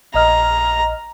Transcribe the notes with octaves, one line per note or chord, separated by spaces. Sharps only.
A#1 D#5 A#5 F6